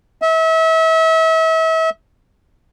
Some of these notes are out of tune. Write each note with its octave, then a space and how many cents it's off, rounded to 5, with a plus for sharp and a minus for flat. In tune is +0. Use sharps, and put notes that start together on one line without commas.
E5 -35